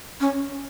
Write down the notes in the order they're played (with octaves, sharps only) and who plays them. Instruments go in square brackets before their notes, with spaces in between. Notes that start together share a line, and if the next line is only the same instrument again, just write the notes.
[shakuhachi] C#4